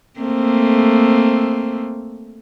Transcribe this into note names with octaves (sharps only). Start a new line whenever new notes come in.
A3 A#3 C4